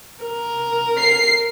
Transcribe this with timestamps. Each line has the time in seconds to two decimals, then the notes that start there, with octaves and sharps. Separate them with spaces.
0.23 A#4
0.99 C7